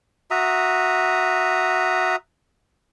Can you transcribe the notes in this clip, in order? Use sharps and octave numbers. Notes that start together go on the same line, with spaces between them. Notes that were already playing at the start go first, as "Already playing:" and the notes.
F#4 E5 A#5 D#6